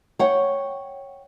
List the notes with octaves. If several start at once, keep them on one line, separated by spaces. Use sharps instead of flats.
C#5 F#5 G5